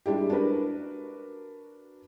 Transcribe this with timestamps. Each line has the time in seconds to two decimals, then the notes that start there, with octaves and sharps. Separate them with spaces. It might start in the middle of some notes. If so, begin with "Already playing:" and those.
0.06 G3 G#3 D4 E4 G4
0.30 D4 F#4 A#4 B4